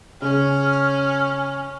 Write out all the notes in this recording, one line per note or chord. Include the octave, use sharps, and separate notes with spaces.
C#3 C#4 F6